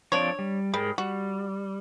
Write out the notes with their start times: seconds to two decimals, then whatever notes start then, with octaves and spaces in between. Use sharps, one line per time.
0.12 F3 C4 D4 C#5 D5
0.39 G3
0.74 G#2 G3 G#4 A#4
0.98 G3 F#4